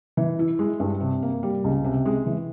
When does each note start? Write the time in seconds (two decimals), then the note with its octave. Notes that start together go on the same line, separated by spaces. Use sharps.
0.17 E3
0.39 E4
0.59 G#3
0.80 G2
1.01 C3
1.23 A#3
1.43 G3
1.64 C#2
1.84 C3
2.06 G#3
2.26 E3